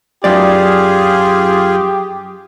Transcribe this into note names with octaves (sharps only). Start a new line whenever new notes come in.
F#2 F4 G4 G#4 D5